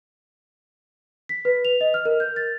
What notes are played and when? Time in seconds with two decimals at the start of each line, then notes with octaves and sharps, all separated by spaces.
1.29 B6
1.45 B4
1.65 F7
1.81 D#5
1.94 F6
2.05 A#4
2.20 G6
2.36 A6